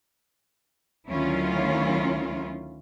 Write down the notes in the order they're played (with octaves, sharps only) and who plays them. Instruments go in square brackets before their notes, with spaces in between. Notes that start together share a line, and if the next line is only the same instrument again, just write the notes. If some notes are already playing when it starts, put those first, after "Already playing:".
[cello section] D2 D#3 F#3 C#4 E4 F4